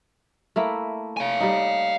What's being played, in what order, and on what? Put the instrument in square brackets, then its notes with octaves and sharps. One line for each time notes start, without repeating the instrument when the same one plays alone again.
[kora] A3 A#3 E4
[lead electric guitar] F5 G#5
[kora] G3 D#4